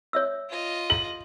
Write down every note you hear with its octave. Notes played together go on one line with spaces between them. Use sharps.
C#5 E5 E6
F4 D#5
F#7